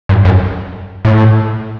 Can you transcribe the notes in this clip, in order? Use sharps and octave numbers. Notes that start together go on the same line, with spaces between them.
G2
F#2
A2